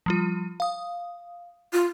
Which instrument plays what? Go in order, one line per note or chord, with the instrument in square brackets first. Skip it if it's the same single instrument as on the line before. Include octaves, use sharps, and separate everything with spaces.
[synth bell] F3 G3 F4
F5 D#6
[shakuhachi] F4